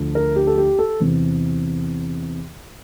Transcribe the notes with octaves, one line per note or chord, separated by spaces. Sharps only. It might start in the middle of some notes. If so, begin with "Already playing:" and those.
Already playing: D2 D3 F3 A3
A#4
G4
A4
G4
A4
E2 C3 E3